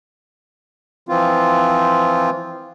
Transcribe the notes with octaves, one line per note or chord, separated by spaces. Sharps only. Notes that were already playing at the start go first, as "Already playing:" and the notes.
E3 F3 C4 F4